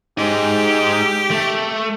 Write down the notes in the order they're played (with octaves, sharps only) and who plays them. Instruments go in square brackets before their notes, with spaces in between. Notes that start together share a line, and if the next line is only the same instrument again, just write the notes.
[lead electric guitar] G#3 D#4 [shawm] G4
[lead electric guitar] A3